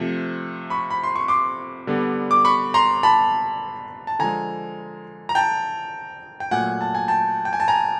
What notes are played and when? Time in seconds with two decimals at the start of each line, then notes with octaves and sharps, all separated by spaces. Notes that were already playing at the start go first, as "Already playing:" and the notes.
Already playing: C3 F3 A3
0.70 B5 C#6
0.91 B5
1.04 C6
1.16 C#6
1.28 C6 D6
1.87 D3 G3 B3
2.31 D6
2.45 B5 C#6
2.74 A#5 C6
3.03 A5 B5
4.07 A5
4.19 D3 F3 G#3 G#5 A#5
5.29 A#5
5.35 G5 A5
6.40 G5
6.51 A#2 F#3 A3 F#5 G#5
6.81 A5
6.95 G#5
7.08 G5 A5
7.45 G5
7.53 G#5
7.60 A5
7.68 G#5 A#5